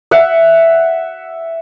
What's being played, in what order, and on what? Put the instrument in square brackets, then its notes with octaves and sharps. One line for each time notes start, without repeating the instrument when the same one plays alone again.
[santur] E5 F#5